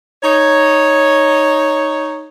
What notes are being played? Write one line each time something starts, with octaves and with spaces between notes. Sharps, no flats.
D#4 C#5